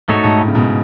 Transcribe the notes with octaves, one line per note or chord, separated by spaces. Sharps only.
G#2 A3 D#4 F#4 A4 C#5
G#2
A2
C#3
G#2 B2